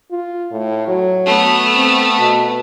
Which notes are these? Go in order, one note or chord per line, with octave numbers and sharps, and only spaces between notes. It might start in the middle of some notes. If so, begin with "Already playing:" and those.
F4
A2
F#3
A3 B3
C4
B2